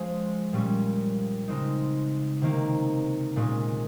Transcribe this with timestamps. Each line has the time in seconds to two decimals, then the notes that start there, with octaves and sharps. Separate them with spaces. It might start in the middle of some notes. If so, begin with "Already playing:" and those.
Already playing: F3 G#3 C#4 G#4 C5
0.53 A#2 G3 C#4
1.48 C#3 G#3 C4 D#4
2.42 C3 D#3 A#3
3.36 A#2 G#3 C#4